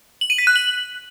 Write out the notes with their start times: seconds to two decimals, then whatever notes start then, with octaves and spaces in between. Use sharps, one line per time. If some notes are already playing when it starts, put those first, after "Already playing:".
0.21 F#7
0.30 D#7
0.38 B6
0.47 F#6
0.56 F#7